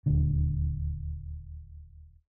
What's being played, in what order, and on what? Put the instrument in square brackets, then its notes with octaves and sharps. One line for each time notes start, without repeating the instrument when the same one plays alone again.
[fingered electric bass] D#1 D2 D3